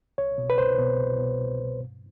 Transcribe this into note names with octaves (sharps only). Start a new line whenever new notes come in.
C2 C#5
B2
B4
C2 C5
B2
C2
B2
C2
B2
G2